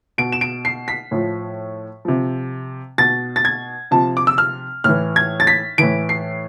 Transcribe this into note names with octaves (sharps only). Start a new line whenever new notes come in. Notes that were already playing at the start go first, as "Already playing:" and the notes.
B2 D7
E7
D7
C7
B6
A2 F3
C3 F3
B2 A6
A6
G#6
C3 F3 A5
D6
E6
F6
A2 E3 F6
G#6
A6
B6
A2 E3 D7
C7